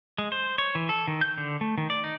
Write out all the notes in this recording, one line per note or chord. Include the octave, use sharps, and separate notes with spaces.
G#3
C5
C#5
E3
A4
D#3
G6
D3
A3
D#3
D5
D#4